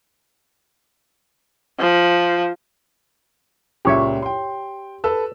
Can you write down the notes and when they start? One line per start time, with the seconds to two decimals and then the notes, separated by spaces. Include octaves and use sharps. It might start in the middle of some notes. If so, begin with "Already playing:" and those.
1.80 F3
3.85 C#2 A#2 G4 C#5 E5
4.22 G5 C6
5.04 A4 B4 E6